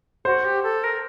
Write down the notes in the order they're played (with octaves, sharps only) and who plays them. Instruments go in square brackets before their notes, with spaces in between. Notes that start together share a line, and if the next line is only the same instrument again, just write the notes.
[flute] F#4 [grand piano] C5
[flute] G4
A4
A#4